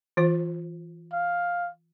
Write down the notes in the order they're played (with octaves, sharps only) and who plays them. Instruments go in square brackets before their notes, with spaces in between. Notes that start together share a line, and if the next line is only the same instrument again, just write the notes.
[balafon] E3 F4 C5
[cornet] F5